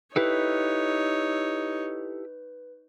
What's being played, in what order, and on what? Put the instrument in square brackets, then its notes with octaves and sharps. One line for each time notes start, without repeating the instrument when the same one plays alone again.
[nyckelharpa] D#4 C#5 [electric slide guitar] E4 G4 A4 [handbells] B4